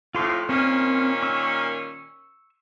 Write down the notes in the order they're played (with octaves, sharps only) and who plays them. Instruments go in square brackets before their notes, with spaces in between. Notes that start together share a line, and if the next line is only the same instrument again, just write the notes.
[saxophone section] F2 A2 [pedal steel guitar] F4 C6
[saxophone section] A#2 D#3 C#4 [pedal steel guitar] C4
[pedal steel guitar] C#6 E6